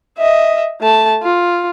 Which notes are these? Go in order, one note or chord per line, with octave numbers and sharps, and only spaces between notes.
D#5 E5
A3 A5
F4